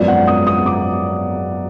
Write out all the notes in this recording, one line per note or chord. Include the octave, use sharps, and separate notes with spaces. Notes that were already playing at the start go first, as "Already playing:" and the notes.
Already playing: G#1 F#2 F3 B3 D5
F#5
D#6
D#6
D6